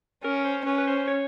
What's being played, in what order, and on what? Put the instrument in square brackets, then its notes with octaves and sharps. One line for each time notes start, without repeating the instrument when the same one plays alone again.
[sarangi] C#4 [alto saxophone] A#4
[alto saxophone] C5
[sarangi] C#4 [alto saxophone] B4
[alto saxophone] B4
C5
C#5